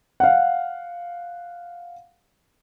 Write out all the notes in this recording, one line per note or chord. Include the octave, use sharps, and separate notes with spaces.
F5 F#5